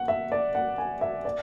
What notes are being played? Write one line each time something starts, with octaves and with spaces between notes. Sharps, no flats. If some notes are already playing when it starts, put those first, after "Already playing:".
Already playing: F#5
E5
D5
F#5
G#5
E5
D5